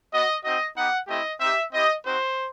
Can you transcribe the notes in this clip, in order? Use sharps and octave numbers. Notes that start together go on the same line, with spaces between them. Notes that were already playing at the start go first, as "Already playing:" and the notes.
B3 F#4 D#5
C4 D#4 F#4 D#5
B3 D#4 G4 F#5
A3 C4 E4 G4 D#5
C4 D#4 G4 E5
C4 E4 G4 D#5
C4 D#4 F#4 C5